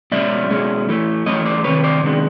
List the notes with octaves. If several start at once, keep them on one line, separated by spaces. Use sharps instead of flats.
B2 G#3 C#4 D5 E5
B2 G#3 C#4
E3 A3 C#4
E3 A3 C#4 C#5 D#5
C5 D5
C3 D#3 B4 C#5
C5 D5
C3 D#3 G#3 B3 D4